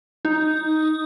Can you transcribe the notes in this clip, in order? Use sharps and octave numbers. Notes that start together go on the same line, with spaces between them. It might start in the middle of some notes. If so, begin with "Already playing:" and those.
D#4